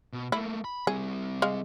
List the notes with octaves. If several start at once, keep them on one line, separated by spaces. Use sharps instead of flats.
B2
A3 A#3 E4
B5
G3 C4 G#4
G#3 F5